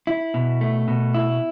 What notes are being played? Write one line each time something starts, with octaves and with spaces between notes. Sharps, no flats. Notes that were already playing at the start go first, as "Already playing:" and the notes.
E4
B2
A3
B2
E4